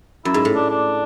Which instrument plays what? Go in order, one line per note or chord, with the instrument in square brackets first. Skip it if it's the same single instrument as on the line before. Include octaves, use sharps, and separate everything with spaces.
[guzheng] F#2 [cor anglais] E4
[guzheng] G#2
A2
[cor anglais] D4
D4